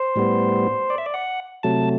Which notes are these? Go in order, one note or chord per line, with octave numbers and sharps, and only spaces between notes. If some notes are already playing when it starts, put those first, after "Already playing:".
Already playing: C5
A2 G3 B3
D5
E5
D5
F#5
C3 F#3 A3 A5